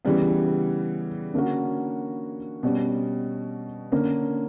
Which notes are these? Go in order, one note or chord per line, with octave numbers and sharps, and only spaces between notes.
C#3 E3 G3 B3
D3 A#3 C#4 F#4
B2 G3 C#4
D3 A#3 C#4